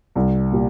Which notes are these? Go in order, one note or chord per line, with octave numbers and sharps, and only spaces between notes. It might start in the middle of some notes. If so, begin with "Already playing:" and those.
C2
A#2 G3